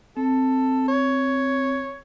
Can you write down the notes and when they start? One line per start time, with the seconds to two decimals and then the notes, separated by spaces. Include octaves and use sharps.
0.17 C4 A4
0.88 C#5